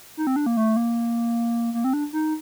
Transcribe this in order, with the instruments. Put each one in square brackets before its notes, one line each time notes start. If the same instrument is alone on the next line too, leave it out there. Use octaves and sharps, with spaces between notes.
[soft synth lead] D#4
C4
D4
A#3
A3
A#3
A#3
C4
D4
D#4